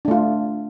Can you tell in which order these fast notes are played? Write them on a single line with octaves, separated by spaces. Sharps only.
D4 A3 F4